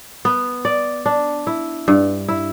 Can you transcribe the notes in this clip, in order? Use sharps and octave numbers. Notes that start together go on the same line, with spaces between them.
B3
D5
D4
E4
G2
E4